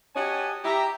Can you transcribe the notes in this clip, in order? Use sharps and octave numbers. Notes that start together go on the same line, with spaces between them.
F#4 G4 C#5 D#5 G#5 A5
G4 E5 A#5